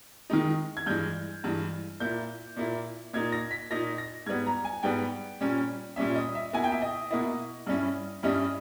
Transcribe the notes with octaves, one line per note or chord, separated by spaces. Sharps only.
D#3 G#3 D#4
G#6
G2 E3 G#3 G6
G2 E3 G#3
A#2 A#3 E4 G6
A#2 A#3 E4
A#2 A#3 D#4 G#6
A#6
B6
A#2 A#3 D#4 A#6
A#6
G#2 G3 B3 G#6
A#5
G#5
G#2 G3 B3 G5
A#2 G3 C#4
A#2 G3 C#4 E5
D#5
E5
B2 A#3 E4 G#5
G5
E5
D#5
B2 A#3 E4 D#5
G2 G3 C#4 E4
G2 G3 C#4 E4 D#5